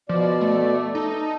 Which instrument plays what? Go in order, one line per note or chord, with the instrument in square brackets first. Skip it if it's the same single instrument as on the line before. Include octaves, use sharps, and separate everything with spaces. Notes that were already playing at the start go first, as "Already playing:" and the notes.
[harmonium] B2 D5 [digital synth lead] F3
[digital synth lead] A3
[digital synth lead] D#4 [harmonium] A4